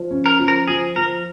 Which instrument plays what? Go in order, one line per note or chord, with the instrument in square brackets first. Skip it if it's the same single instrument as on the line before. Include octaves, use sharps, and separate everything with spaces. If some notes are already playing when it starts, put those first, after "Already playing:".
Already playing: [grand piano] F3
C#4
[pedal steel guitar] A#4
[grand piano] F3
[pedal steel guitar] A#4
[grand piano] F3 [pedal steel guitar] G#4
[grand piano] F3 [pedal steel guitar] A#4